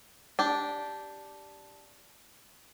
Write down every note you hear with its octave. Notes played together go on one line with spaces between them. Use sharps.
D4 G4